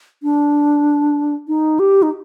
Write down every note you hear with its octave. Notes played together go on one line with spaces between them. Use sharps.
D4
D#4
G4
D#4